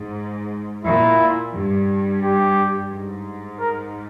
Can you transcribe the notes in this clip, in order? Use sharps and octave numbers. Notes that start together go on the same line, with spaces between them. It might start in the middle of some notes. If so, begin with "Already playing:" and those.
Already playing: G#2
A#2 E4
G2
G4
G#2
A#4